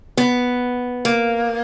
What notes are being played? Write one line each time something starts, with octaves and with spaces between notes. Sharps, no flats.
B3
A#3